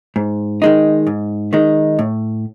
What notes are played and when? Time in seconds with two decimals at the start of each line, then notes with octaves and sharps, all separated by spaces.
0.16 G#2
0.62 D#3 G#3 D#4
1.07 G#2
1.53 D#3 G#3 D#4
1.99 A2